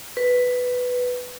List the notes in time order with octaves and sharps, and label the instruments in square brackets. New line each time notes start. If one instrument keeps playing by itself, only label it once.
[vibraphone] B4